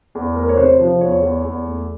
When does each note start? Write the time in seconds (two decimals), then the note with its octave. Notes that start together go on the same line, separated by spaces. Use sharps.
0.15 E2
0.36 A3 A#4
0.49 C#5
0.57 C3 C5
0.79 F3 C5
1.01 E2 C#5
1.22 E2
1.45 E2
1.67 A3